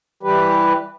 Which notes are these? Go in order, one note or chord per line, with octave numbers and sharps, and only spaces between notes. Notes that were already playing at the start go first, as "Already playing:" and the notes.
E3 G3 G4 B4